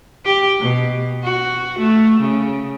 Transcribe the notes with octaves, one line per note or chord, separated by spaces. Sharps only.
G4
B2
F#4
A3
C#3